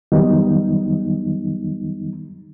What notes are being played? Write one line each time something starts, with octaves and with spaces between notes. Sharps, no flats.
F2 D#3 F#3 G3 B3 D#4